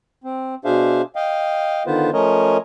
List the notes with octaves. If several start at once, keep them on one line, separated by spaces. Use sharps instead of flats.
C4
B2 D4 G#4 C5 E5 F5
D#5 F5 G5
D3 D#3 B3 F4 B4 C5
F3 A3 C#4 A#4 C#5 D#5